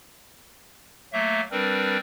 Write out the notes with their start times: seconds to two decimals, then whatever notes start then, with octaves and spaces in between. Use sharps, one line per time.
1.13 F#3 A3 A#3 E5
1.51 G3 C4 D4 A#4 B4